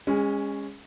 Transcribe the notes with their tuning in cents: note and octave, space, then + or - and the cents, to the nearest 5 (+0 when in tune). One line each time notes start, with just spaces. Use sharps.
G#3 -25 C#4 +0